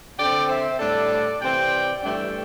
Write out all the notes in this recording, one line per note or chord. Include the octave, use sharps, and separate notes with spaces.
D3 C4 D5 G5
C5 E5
A2 G3 D4 A4 D5
C3 E3 C4 D5 G5
G2 E3 A3 D4 D5 G5